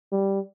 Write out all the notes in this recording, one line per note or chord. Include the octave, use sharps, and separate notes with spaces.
G3